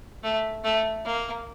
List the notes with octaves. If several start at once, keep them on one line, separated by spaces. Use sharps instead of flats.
A3
A3
A#3